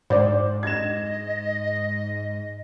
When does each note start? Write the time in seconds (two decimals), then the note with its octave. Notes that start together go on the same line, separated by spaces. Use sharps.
0.10 G#2 C5 D5
0.63 D#5 G#6 E7